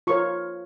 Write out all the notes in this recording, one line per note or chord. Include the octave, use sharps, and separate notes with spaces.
F4 A#4 C#5 C#6